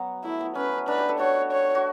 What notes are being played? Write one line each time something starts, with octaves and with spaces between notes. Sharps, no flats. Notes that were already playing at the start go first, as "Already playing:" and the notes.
Already playing: F#3 B3
A3 E4
B3
C#4 B4
D4 B4
G4
A4
F#4 C#5
C#5
F#4